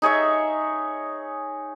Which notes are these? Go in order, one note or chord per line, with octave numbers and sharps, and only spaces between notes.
D#4 G#4 C#5 E5